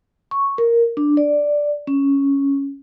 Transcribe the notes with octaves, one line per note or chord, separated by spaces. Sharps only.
C#6
A#4
D4
D5
C#4